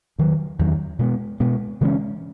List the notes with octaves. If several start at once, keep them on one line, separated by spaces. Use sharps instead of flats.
E2 D#3 F#3
E2 D#3 F#3
B2 G#3 B3
B2 G#3 B3
C#3 E3 G#3 C#4